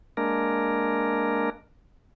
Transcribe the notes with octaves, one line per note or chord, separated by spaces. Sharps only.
G#3 A#3 D4 A#4